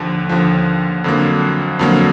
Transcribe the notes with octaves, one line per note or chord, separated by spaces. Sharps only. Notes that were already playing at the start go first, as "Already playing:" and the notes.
Already playing: D#2 D3 F3
D#2 D3 F3
F2 D3 F#3 A#3
F2 D3 F#3 A#3